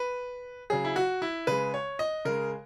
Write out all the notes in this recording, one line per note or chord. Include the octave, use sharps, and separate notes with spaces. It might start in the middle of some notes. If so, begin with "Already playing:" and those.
Already playing: B4
C#3 F#3 G#4
E4
F#4
E4
C#3 G#3 B4
C#5
D#5
C#3 G#3 A#4